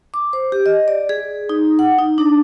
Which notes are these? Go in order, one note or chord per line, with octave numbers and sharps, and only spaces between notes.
D6
C5
G4
D#5
D5
G#4
D#4
F#5
D#4
D4